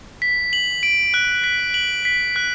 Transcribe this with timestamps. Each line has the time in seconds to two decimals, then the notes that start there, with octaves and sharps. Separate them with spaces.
0.22 B6
0.53 F#7
0.83 D7
1.14 F#6
1.44 B6
1.74 F#7
2.05 B6
2.36 F#6